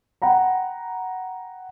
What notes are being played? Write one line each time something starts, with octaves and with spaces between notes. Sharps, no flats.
F#5 G5 A#5 B5